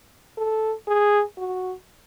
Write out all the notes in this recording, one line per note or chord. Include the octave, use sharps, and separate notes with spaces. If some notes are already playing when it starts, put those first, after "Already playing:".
A4
G#4
F#4